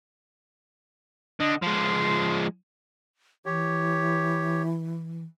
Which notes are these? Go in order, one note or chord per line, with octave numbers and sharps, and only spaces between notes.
D3 D#5
F3 G#3 C6
E3 G4 C#5